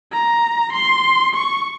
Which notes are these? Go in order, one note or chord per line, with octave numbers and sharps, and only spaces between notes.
A#5
C6
C#6